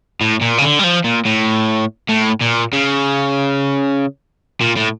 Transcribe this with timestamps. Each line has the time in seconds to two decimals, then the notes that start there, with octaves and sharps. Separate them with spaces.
0.21 A2
0.41 A#2
0.58 C#3
0.62 D3
0.79 G3
0.84 F3
1.05 A#2
1.26 A2
2.09 A2
2.41 A#2
2.73 C#3
4.61 A#2
4.76 A2